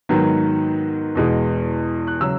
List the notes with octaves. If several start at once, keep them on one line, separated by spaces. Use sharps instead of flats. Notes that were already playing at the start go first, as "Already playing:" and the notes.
G#2 D#3 F#3 B3
E2 B2 G#3
F#6
C#3 F#3 C#4 E6